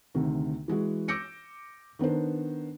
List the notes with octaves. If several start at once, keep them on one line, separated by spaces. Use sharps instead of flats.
D2 C3 D#3
E3 G#3 F#4
D6 E6 G6 A#6 C#7 D7
D#3 B3 D4 A#4 C5